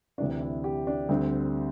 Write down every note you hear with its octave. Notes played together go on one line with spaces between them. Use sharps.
D2 C3 E3 D4
E4
G4
D4
D2 D3 G3 C4